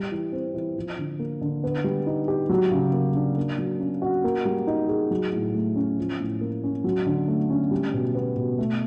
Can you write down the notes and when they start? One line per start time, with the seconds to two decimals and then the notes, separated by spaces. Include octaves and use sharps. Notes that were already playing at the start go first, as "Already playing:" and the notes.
Already playing: G3
0.11 E3
0.32 C4
0.54 E3
0.76 F3
0.98 D3
1.19 A#3
1.41 D3
1.64 B3
1.84 G3
2.07 D#4
2.28 G4
2.49 F#3
2.72 C#3
2.93 A#3
3.16 D4
3.37 A#3
3.58 F#3
3.80 C#4
4.02 F#4
4.24 A#3
4.45 G3
4.67 D#4
4.88 G#4
5.11 F#3
5.32 A2
5.54 A3
5.76 C#4
5.98 F3
6.19 A2
6.41 A#3
6.63 C#4
6.84 F#3
7.06 D3
7.28 A3
7.50 C#4
7.71 G3
7.93 B2
8.15 B3
8.36 B2
8.59 A3